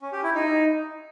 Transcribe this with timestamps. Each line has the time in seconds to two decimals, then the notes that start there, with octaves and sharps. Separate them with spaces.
0.01 C#4
0.12 G4
0.24 E4
0.35 D#4